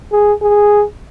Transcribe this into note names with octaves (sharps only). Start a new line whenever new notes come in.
G#4
G#4